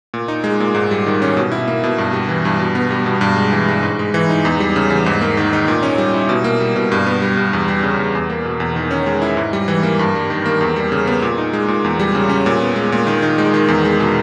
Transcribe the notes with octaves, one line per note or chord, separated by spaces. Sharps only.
A#2
D#4
G#3
A#2
G#2
G3
D#3
C#4
B2
E4
A#3
B2
G2
G3
E3
G2
B2
B3
G3
B2
G2
G#3
E3
G2
G#2
G#3
E3
D#4
E2
G3
C#3
E2
G#2
A#3
D#3
D#4
A#2
C#4
G3
E4
B2
A#3
G3
B2
G2
B3
G3
G2
E2
G3
C#3
E2
E2
A#3
B2
E2
D#3
C#4
G#3
E4
G#2
G3
E3
A#3
G2
G3
D#3
A#3
E2
G3
C#3
B3
A#2
D#4
G#3
A#2
E2
G3
C#3
C#4
A#2
B3
G#3
A#2
D#3
D#4
G#3
D#3
E2
G#3
B2